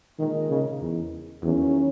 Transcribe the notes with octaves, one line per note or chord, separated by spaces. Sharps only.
A#2 D#3 G#3 D#4 A#4 D#5
C#3
E2
E2 D#3 F#3 A#3 C#4 E4